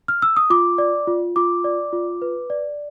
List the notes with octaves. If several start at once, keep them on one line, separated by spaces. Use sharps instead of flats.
F6
E6
D#6
F4 D6
D5
F4
F4 D6
D5
F4
B4
D5